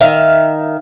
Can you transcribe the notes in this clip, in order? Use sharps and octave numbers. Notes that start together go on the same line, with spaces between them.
D#3 E5 F5